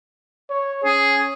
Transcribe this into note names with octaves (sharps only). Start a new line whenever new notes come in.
C#5
C#4 G#4